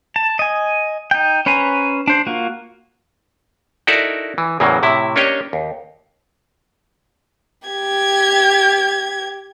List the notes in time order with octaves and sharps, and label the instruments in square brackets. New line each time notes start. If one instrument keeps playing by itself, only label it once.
[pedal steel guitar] A5
D#5 G#5
D#4 G5
C#4 B4 C5 G#5 A#5
D4 C5
A#3 F4 F#4
[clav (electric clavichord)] D#4 E4 F#4 A4 A#4 D5
E3
E2 A2 C#3 E3 F#3 A#3
A2 C3 E4
A#3 C#4 D4 G4 C#5 D#5
D#2
[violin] G4 G#6